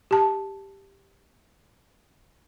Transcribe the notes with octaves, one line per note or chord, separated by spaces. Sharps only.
G4 A5